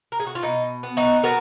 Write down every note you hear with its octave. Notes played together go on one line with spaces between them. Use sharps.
A#4
G#4
F#4
F4
B2 D#4
B3
D#4 F#4
B3 F#4 A#4